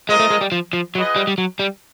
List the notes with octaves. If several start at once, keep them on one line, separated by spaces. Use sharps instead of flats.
G#3 C4 F4 A#4 D#5
A3
G#3
G3
F3
F3
F#3 F4 G#4 B4 D#5 F#5
G3
G3
F#3
G3